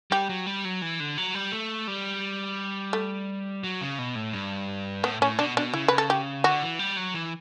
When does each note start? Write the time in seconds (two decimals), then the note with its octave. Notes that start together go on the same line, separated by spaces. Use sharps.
0.11 G3 G4
0.29 F#3
0.46 G3
0.65 F#3
0.82 E3
1.00 D3
1.18 F#3
1.35 G3
1.52 A3
1.88 G3
2.93 A3
3.64 F#3
3.81 C#3
3.99 B2
4.15 A2
4.33 G2
5.03 A2 B3
5.21 A2 C#4
5.39 B2 D4
5.57 B2 D4
5.74 C#3 E4
5.88 B4
5.98 A4
6.10 G4
6.44 D3 F#4
6.63 E3
6.79 G3
6.97 F#3
7.14 E3